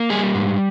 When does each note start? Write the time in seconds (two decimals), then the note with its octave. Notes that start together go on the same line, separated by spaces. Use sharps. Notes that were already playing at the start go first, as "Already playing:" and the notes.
Already playing: A#3
0.10 G3 G#4
0.35 G#2